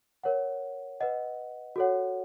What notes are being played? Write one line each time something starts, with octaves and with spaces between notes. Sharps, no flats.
A#4 C#5 F#5
B4 D#5 F#5
F#4 A4 C#5 F#5